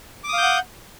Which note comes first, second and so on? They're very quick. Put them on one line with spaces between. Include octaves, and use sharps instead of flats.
D6 D#6 F5 G6 F#5